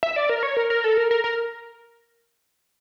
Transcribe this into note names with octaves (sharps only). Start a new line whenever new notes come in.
E5
D5
A#4
C#5
A#4
A#4
A4
A#4
A#4
A#4